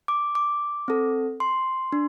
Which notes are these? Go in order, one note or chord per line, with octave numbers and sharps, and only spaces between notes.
D6
D6
C4 A4
C6
D4